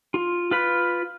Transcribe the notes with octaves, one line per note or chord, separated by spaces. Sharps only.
F4
F4 B4 B5